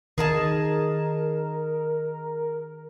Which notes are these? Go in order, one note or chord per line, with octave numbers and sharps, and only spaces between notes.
D#3 G#4 A#4 D#5 A5